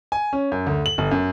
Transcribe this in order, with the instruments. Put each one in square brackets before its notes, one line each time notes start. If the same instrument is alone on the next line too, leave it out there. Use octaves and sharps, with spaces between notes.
[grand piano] G#5
C#4
F#2
D2
F#7
G1
F#2